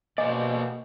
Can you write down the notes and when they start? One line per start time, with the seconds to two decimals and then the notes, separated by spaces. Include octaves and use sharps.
0.18 B2 A#3 C5 D5 D#5 G#5